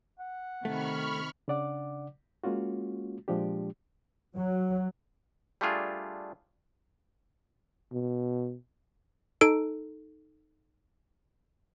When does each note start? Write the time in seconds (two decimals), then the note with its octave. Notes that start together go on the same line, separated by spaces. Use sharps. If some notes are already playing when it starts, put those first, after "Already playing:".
0.19 F#5
0.65 C3 D#3 A3 B5 C#6 F6
1.48 C#3 D4 D5 F#5 D6
2.44 G#3 A#3 C#4 F4 F#4
3.28 A#2 F3 G#3 D4 G4
4.37 F#3
5.61 G3 A3 D4 F4 G#4
7.93 B2
9.41 D#4 A4 D7